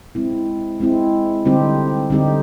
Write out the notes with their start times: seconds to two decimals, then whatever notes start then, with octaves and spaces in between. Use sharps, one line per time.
0.15 G#3 C4 E4
0.81 G#3 C4 E4
1.45 D3 G3 C4 D#4 G4
2.10 D3 G3 C4 D#4 G4